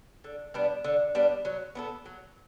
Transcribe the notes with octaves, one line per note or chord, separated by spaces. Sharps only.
D3
G3 B3 D4
D3
G3 B3 D4
F#3
B3 D4 A4
F#3